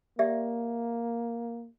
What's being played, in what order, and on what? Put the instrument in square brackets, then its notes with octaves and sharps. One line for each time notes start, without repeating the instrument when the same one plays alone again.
[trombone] A#3 [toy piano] G4 D5 E5